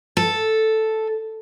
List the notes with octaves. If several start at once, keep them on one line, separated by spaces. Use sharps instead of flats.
A4